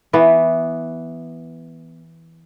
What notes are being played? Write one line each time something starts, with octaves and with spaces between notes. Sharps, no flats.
E3 B3